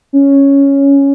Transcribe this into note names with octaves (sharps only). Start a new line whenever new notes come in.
C#4